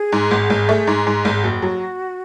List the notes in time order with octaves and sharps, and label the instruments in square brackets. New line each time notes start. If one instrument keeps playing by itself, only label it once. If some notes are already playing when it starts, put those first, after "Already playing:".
Already playing: [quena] G#4
[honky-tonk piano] G#2
G#1
G#1
A3
G#2
G#2
G#1
[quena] G#4
[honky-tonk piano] F#1 [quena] F#4
[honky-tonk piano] F#3